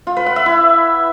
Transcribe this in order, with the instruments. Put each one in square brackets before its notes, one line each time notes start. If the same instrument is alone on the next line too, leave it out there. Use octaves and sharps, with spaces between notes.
[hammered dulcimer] F4
B4
F#5
E5
E4